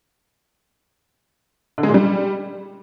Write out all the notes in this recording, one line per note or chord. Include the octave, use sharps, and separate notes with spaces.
D3
G#3
A#2
G3